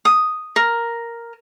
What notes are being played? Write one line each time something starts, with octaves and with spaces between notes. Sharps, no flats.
D#6
A#4